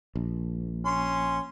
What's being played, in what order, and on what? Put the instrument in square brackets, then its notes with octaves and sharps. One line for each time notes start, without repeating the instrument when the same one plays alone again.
[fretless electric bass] A#1
[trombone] C#4 [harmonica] C6